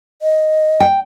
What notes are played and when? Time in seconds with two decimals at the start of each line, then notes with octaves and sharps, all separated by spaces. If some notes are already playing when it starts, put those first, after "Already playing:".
0.22 D#5
0.80 G5